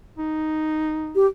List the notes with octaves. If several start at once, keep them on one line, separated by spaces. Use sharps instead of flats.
D#4
G4